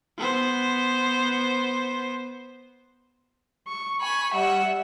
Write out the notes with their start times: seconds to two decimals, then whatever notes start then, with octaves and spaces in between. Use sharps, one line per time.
0.18 B3 C5
3.66 C#6
4.01 G#5 B5 C#6
4.33 G3 E5 F#5